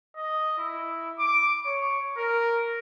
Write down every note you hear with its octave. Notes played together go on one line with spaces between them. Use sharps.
D#5
E4
D6
C#5
A#4